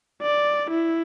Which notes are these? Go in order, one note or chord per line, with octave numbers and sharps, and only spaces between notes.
D5
E4